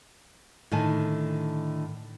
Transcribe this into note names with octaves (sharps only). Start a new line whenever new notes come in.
A2 D3 D#3 G#5 A5